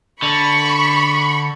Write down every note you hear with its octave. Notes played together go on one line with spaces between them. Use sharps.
D3 B5 C#6